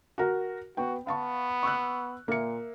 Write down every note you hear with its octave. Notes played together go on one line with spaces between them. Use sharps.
F#4 A#4
B3 F#4 G5
B3 F5 A5 C#6
C#6 E6 F#6
A#2 A#3 E5 C#7